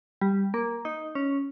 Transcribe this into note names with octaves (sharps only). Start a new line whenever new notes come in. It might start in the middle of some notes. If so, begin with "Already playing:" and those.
G3
A#3
D#4
C#4